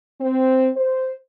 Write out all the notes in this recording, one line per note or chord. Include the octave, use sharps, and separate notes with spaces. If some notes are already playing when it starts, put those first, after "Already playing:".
C4
C5